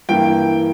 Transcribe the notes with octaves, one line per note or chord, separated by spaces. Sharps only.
G2 E3 A#3 G5